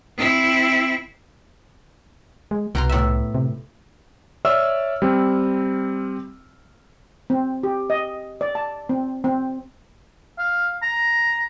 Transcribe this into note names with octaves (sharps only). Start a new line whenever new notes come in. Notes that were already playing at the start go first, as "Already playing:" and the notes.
C4 E4
G#3
C2 B2 A#5 C6
A2 E5
C3
C#5 D5 E5 C#6 E6 F6
G3 C4
C4
G4
D#5
D5
A5
C4
C4
F5
A#5